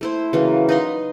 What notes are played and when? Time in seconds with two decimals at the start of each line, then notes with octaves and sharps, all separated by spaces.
0.01 A3 E4 C5
0.33 C#3 E3 F#3 A#3
0.69 D#4 B4 A#5 C6